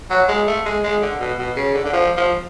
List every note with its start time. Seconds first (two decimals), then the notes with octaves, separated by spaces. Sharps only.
0.10 F#3
0.28 G#3
0.47 A3
0.65 G#3
0.84 G#3
1.02 D3
1.19 B2
1.38 B2
1.56 C#3
1.74 D3
1.85 D3
1.93 F3
2.17 F3